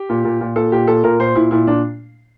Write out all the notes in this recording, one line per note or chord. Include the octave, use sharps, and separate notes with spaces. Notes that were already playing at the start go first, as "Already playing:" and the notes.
Already playing: G4
A#2
A#2
A#2
A#2 A4
A#2 G4
A#2 A4
A#2 A#4
A#2 C5
A#2 E4
A#2 E4
A#2 D4